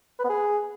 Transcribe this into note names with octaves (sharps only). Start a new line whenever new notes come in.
B4
B3
G#4